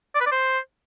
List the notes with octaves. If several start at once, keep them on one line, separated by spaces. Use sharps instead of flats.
D5
B4
D5
C5